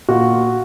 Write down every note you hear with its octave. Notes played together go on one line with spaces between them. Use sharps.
A#2 F#4